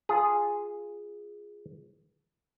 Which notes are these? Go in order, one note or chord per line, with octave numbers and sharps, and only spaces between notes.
F4 G#4